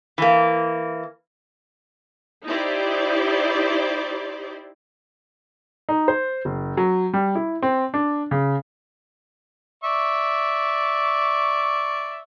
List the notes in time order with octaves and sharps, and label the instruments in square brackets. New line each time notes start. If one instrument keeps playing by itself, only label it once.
[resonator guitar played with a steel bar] E3 A#3
[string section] D#4 E4 G4 C5 D5
[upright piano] D#4
C5
F#1
F#3
G3
E4
C4
D4
C#3
[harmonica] D5 E5 C#6